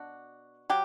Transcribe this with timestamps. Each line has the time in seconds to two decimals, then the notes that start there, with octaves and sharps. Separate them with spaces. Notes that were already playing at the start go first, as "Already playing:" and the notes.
Already playing: B2 D4 F#4
0.70 F#3 G4